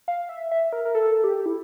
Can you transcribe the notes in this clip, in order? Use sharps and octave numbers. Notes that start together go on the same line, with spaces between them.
F5
E5
E5
A#4
A#4
A4
G4
E4